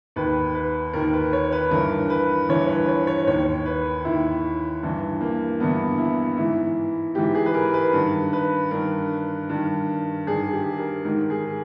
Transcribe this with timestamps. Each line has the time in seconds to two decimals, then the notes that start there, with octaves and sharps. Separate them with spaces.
0.16 D#2 D#3 B4
0.55 B4
0.93 D#2 D#3 A#4
1.13 B4
1.33 C#5
1.52 B4
1.71 G2 E3 A#4
2.10 B4
2.49 G2 E3 C#5
2.68 B4
2.89 C#5
3.07 C#5
3.27 D#2 D#3 C#5
3.65 B4
4.05 D#2 D#3 E4
4.83 G2 E3
5.21 A#3
5.60 G2 E3 B3
5.98 E4
6.37 G#2 E3 E4
7.15 G#2 E3 G4
7.35 G#4
7.46 B4
7.54 A#4
7.74 B4
7.93 G2 D#3
8.33 B4
8.71 G2 D#3 A#4
9.49 G2 D#3
10.27 G2 D#3 G#4
10.53 G4
10.78 A#4
11.05 G#2 D#3 A#4
11.30 G#4